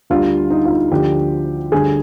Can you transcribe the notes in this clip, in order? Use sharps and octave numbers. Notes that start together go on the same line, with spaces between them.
D2 D3 G3 F4
D#4
F4
D#4
D2 D3 F3 G4
D2 D3 G3 G#4